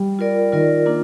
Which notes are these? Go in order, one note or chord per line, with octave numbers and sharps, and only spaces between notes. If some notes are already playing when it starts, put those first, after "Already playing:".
Already playing: G3
F4 A#4 D5
D#3 F4 A#4 D5
A#3 D4 F4